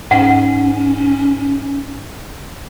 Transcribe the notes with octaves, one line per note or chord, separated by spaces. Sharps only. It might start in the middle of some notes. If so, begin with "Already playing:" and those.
G#2 C#4 F#5